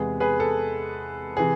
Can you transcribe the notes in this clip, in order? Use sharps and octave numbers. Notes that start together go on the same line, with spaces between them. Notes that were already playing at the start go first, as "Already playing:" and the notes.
Already playing: E2 C3 G#3 B3 G#4
G#4 B4
A4
C3 E3 G#4